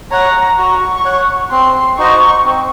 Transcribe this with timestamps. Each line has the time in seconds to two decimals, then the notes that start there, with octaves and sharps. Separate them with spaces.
0.11 C#5 F#5 A#5
0.58 F#4 C#6
1.05 C#5 F#5
1.51 C4 C6
1.98 D#4 F#4 C5 D#5 C#6
2.45 C4